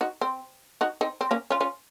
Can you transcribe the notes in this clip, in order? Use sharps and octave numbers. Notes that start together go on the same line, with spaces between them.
D#4 F#4
C4
D#4 F#4
C4 D#4
C4
A#3 C#4
C#4 F4
C#4 F4